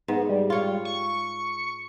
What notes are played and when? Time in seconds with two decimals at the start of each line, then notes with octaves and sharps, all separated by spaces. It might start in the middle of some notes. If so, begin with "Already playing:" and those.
0.08 G#2 B3
0.29 G3
0.50 F4 C#5
0.85 C#6